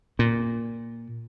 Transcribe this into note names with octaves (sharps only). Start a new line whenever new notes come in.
A#2